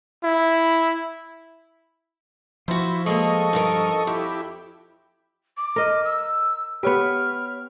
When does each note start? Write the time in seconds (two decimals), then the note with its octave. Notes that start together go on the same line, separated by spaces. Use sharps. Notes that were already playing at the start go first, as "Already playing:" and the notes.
0.24 E4
2.68 F3 E4 F#4 C5
3.06 G#3 A#3 A4 D#5 C#6
3.53 G2 D#4 A#4
4.07 F2 E4 G4
5.57 D6
5.76 A#4 D#5
6.04 E6
6.83 B3 G4 B4 C#5 B5 F6